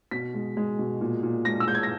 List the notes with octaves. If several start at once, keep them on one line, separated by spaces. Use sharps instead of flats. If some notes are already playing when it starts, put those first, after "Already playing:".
B2 B6
G#3
G#3
B2
A#2
A#2
G#3 A#6
E6
G#3 G6
G#6
A#6